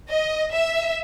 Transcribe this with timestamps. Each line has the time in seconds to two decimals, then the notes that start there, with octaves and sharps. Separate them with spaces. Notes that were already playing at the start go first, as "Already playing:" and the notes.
0.10 D#5
0.54 E5